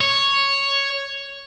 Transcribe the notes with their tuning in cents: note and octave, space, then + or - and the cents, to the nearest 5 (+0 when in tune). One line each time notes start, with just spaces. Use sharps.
C#5 +0